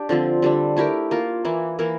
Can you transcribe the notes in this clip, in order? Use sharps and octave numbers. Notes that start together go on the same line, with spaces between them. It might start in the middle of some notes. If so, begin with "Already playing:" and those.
Already playing: D4 G4
D3 F3 C4
D3 G3 D4
A3 E4 G4 A#4
A#3 F4 A#4
E3 A#3 E4
E3 A#3 E4 A#4